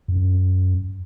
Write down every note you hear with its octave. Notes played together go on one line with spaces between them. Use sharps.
F#2